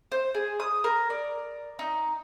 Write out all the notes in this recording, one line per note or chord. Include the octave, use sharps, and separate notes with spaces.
C5
G#4
D#6
A#4
D5
D#4